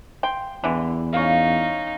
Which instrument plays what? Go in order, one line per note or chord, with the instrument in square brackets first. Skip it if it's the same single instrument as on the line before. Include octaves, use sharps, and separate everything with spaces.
[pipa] G5 [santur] C6
[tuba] E2 [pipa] D3 E3
[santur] C#4 F5 [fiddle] D#4